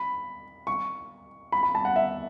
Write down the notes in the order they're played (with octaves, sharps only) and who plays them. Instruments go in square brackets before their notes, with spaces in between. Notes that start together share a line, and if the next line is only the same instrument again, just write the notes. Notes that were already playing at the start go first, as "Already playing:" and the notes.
Already playing: [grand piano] B5
C#6
B5
B5
A5
F#5
E5